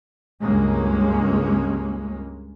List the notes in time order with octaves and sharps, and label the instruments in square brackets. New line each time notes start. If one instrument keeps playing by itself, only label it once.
[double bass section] C#2 G2 G#3 A#3 C#4